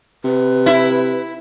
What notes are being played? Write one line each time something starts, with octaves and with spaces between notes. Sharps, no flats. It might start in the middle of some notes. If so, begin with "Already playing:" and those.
C3 B4
E4